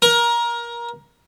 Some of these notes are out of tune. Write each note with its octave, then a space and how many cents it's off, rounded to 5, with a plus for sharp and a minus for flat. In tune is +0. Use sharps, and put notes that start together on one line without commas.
A#4 +20